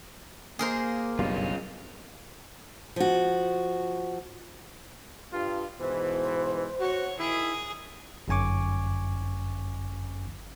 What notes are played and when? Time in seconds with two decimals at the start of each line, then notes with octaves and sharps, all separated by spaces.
0.59 A#3 G#4 A#4 C5
1.19 F#1 B1 G2 C#4 F4
2.96 F3 F#4
5.33 G2 F4
5.80 G#2 B2 E3 C5
6.80 F#4 C#5
7.19 D#3 E4 G#4
8.28 G1 F#2 C#4 G#5 C#6 D6